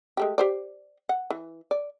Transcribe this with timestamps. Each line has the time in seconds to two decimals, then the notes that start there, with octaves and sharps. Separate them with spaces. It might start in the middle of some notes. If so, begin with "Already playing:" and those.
0.17 G#3 A3 G4
0.38 G4 C5 D5
1.09 F#5
1.31 E3
1.71 D5